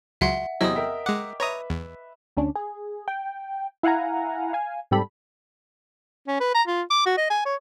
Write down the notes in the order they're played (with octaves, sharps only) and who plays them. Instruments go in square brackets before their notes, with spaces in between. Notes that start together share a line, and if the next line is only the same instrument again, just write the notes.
[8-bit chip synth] C#2 F#3 C6 [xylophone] E5 F#5
[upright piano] E2 C3 C4 [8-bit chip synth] F#3 E4 [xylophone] D#5 D#6
[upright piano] A#4 E5 G5
[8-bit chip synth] G#3 F#5 [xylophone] D6
[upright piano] B4 E5 [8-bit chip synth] C#5 A#5 D#6
[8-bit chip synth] E2
[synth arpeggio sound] D2 C#4 D4
G#4
G5
E4 F5 F#5 G#5 A#5
F5 G#5
G#2 C3 G3 G4 A4 B5
[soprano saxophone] C#4
B4
A#5
F4
D6
F#4
D#5
G#5
C#5